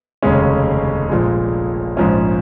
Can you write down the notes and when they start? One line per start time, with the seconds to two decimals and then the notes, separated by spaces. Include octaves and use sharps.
0.23 F1 D#2 C#3 G#3 C#4
1.09 A#1 A#2 G#3
1.97 A#1 G#2 F3 C#4